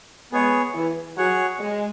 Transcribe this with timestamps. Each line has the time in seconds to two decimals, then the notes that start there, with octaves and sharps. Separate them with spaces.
0.32 G#3 B3 G#4 C#5
0.74 E3
1.17 F#3 G#4 C#5 F#5
1.59 G#3